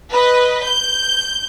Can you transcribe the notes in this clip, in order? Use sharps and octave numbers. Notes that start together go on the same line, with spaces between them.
B4 D#5
G6